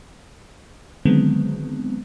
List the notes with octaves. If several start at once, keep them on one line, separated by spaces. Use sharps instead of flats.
D3 D#3 F#3 G#3 B3 C4